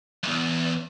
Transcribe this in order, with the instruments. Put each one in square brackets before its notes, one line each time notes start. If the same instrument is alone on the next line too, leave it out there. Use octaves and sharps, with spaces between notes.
[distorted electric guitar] B1 E2